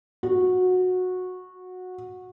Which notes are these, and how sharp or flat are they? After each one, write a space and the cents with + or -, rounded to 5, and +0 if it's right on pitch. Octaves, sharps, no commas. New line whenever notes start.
F#4 -15